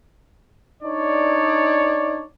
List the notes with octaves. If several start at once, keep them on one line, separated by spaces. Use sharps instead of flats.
D4 D#4 C#5 D5